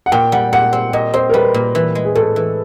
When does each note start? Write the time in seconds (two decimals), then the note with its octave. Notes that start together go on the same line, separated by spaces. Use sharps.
0.06 F#5
0.12 A#2 G5
0.32 G3 F#5
0.53 A#2 F#5
0.73 C4
0.93 A#2 D#5
1.14 C4 C5
1.29 A#4
1.34 G3 B4
1.54 A#2
1.75 E3
1.95 G#3
2.05 G#4
2.15 A2 A4
2.36 E3